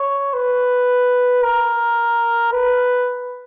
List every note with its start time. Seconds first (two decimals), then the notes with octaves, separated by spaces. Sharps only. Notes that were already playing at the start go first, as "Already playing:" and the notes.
Already playing: C#5
0.34 B4
1.43 A#4
2.53 B4